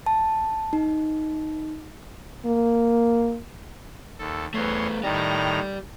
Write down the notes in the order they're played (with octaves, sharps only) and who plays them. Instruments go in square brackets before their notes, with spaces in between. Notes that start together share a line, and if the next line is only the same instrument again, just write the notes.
[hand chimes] A5
D#4
[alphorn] A#3
[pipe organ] D#2 A4
[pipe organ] E2 C#5 C6 [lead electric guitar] A3 B3
[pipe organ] A2 D#3 A#5 [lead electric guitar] G4 D5